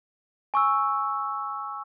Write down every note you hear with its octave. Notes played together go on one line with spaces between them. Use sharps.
G#5 C#6 E6